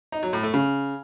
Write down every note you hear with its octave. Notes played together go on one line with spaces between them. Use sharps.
D#4
F#3
A2
A3
C#3